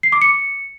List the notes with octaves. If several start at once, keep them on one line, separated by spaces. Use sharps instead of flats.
C7
D6
C#7